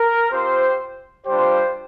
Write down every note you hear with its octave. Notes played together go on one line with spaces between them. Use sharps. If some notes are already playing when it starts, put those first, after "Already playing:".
Already playing: A#4
C4 F4 G4 C5
G3 D4 F4 G4 C5